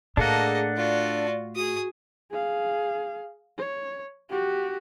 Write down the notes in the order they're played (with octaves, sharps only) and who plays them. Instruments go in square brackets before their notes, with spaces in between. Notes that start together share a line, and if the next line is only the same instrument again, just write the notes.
[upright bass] A2 [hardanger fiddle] A#3 D#5 [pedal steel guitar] D4 A4 F#5 [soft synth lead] G#4
[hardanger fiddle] F4 F#4 [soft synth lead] D5
[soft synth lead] F#4 [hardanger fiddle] G#4 D#6
[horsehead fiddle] G#4 F5
C#5
F#4 G4